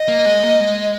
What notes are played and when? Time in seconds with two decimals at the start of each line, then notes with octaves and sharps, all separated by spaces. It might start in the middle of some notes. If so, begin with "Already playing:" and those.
Already playing: D#5
0.08 A#3
0.26 G#3
0.43 A#3
0.60 G#3